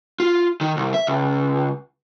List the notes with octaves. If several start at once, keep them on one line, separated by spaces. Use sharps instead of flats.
F4
D#3
C2
E5
C#2